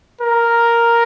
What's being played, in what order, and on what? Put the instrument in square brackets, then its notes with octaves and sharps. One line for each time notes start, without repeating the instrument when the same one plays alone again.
[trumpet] A#4